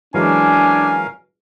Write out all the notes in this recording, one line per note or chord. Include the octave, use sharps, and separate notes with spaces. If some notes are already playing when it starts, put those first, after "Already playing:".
E3 F#3 G#3 C#4 D4 A#4 F5 G#5